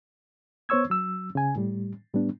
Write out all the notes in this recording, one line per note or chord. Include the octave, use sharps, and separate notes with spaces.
B3 C5 C#5 C#6 E6 G#6
F#3 E6
C#3 G#5
A2 G3
A2 G3 B3 D4